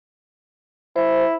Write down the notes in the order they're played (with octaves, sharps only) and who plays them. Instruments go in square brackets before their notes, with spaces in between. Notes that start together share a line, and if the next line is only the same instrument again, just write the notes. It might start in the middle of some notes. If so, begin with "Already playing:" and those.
[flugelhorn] E4 [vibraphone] C5